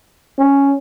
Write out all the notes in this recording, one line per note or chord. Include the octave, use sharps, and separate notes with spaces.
C#4